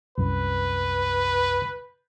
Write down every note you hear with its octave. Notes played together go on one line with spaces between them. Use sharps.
C2 F#2 B4